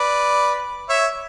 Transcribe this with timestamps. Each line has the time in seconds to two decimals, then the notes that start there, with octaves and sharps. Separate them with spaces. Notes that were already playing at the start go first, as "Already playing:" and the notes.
Already playing: B4 D5
0.89 C#5 E5